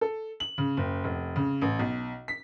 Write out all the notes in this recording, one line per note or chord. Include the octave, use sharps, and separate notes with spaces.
A4
F#7
C#3
F#1
F1
C#3
A1
B1
B6